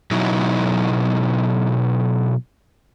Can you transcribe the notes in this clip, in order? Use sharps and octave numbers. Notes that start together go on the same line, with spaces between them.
B2 F#3 D#4 E4